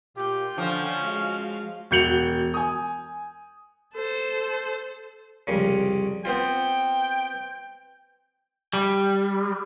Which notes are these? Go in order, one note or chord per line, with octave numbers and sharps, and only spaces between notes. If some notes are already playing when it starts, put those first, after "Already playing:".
A#2 F4 G4 G5
D3 F3 C#4
G#3 F#4 F5
E1 F#4 G6 C#7 F7 F#7
G#5 D#6
A4 C5
C2 F2 C#3
B3 C4 F4 G5
G3